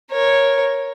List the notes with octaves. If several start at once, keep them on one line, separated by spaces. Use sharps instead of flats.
A#4 C#5